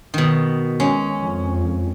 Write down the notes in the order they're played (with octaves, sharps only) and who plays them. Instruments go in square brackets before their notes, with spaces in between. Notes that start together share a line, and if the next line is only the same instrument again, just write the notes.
[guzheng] B2 D#3
G#3 C#4
[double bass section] F2